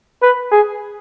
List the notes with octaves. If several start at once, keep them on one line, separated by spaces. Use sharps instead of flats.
B4
G#4